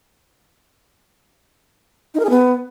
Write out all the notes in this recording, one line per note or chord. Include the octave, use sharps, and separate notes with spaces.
D#4
A#4
G#4
B3